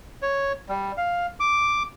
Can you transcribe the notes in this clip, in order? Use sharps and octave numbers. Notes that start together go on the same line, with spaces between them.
C#5
G3
F5
D6